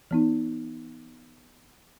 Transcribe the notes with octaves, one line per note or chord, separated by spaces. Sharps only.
E3 B3 D#4